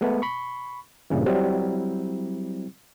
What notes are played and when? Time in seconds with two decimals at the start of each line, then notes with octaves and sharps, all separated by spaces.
0.01 G#3 A3 B3
0.22 B5 C#6
1.10 G2 A#2 C#3 E3
1.26 F#3 G3 C4 E4